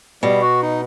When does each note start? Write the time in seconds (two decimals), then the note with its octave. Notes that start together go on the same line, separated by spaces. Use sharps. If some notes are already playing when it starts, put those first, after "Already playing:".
0.23 B2 G3
0.42 F#4
0.62 D#4